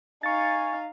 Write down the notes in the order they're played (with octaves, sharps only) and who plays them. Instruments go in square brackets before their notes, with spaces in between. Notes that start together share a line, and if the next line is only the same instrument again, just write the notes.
[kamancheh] D#4 F5 [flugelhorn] G#5 [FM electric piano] C#6 A6